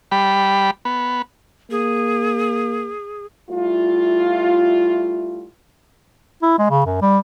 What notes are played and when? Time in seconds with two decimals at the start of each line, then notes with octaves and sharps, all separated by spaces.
0.12 G3 B5
0.85 B3
1.71 A#3 G#4
3.50 G3 A3 E4 F4
6.42 E4
6.59 G#3
6.70 C#3
6.86 F#2
7.02 G3